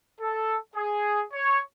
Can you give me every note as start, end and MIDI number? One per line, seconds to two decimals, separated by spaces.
0.20 0.56 69
0.75 1.23 68
1.33 1.61 73